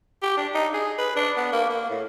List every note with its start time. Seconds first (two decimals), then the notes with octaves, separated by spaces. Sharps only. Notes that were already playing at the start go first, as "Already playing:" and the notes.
0.22 G4
0.37 D4
0.54 D#4
0.74 G#4
0.98 B4
1.16 D4
1.37 B3
1.52 A#3
1.70 A#3
1.90 A2